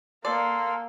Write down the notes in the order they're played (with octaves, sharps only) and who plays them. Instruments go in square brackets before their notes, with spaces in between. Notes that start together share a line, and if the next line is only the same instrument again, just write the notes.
[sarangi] A#3 [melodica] A4 C6 [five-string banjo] D5